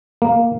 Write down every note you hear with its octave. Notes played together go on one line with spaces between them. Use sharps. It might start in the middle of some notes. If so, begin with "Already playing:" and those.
A#3